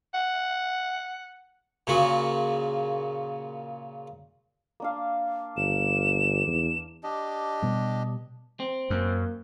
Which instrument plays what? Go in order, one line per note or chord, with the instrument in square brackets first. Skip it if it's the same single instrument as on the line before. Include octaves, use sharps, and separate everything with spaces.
[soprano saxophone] F#5
[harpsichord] A#2 C#3 F#4
[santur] A#3 D4 F5
[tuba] G1 [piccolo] E7
[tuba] E2
[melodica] D4 G4 D#5
[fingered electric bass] B2 G3
[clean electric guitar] C4
[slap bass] F#2 [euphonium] A#3